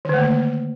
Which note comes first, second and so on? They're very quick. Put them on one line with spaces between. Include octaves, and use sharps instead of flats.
D#3 D3 A3 A#3